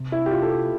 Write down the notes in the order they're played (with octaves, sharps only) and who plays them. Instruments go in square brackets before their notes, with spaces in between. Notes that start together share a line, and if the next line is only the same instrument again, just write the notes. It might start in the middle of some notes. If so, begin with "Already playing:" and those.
Already playing: [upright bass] C3
[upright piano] E4
G4
F4
A4
G4